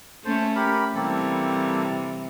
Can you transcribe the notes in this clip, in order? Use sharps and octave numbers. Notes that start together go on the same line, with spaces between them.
A3 C#4 C5 A5
G4 A#4 B5
C3 E3 G3 A#3 C4 A4